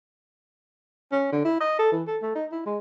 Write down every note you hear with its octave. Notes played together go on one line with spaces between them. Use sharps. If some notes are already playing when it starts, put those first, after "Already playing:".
C#4
D3
E4
D#5
A4
E3
A4
A3
D#4
E4
G#3